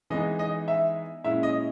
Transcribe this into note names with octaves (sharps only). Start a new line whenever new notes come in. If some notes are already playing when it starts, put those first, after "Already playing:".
E3 G#3 B3 D#4 D#5
D#5
E5
A#2 G#3 C#4 E4 E5
D#5